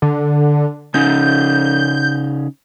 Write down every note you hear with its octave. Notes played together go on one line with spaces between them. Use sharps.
D3
C#3 C#4 D#4 G6